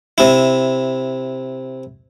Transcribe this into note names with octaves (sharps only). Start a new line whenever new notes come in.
C3 E4